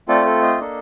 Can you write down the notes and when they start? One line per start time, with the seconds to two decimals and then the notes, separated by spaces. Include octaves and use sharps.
0.08 A3 C4 F4 A4 D5
0.26 A4
0.43 D#5
0.60 A#3 D4 A4